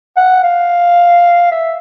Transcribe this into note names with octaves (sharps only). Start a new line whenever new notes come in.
F#5
F5
E5